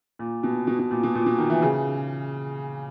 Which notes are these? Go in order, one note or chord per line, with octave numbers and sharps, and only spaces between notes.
A#2
B2
B2
B2
A#2
B2
A#2
B2
D#3
E3
C#3